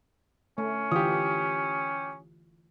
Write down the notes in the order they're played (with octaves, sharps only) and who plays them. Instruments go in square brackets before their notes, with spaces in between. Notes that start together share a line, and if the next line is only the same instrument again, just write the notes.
[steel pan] A3 [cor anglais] C#4
[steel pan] D3 E3 F4 [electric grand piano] G4 D#6